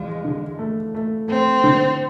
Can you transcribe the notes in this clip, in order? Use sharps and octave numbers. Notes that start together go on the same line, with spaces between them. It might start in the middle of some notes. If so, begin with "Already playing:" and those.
Already playing: E2 F3 G#3
D3
A3
A3
A3 C4
D3